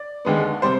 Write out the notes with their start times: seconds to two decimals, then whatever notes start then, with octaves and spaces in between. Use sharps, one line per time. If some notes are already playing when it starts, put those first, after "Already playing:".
Already playing: D5
0.25 D#2 D3 G#3 B3
0.62 C3 G3 C5